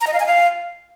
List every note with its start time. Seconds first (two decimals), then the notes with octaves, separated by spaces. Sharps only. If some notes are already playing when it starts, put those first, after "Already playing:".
0.01 A#5
0.07 D#5
0.13 F5
0.20 G#5
0.26 F5